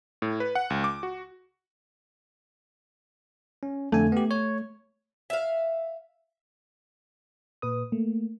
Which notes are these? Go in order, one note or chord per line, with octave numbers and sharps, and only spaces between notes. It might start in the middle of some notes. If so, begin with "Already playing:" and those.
A2
B4
F#5
C#2
D6
F#4
C#4
F2 D3 A3 G#5
B3 G4
C#5
E5 F5
A#2 B4 D#6
A3 A#3